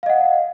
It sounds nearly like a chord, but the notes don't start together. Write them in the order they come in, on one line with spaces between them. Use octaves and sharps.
F5 D#5 F#5